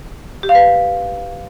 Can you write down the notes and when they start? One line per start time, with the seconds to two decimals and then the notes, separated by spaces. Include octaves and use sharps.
0.43 G4
0.49 F5
0.55 B4